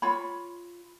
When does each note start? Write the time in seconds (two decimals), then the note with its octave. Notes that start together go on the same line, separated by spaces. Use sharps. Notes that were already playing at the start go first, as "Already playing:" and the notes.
0.02 F4 C#5 B5